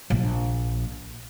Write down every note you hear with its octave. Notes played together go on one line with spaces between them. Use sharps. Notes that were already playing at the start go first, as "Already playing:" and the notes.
A#1